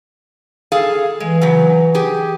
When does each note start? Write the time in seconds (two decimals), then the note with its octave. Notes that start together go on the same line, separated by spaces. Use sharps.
0.72 G#4 A4 F5
1.20 E3 G#3
1.41 C#3 F#3
1.95 G4 G#4